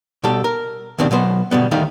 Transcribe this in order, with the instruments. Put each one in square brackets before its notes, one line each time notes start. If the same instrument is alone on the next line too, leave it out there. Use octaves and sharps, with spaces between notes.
[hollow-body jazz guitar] B2 G3 G4 A4
A#4
D#2 B2 D#3 C4 D4
B2 F#3 B3 C5
B2 D3 G3 B3
D2 D#3 G3 A3 D#4 F5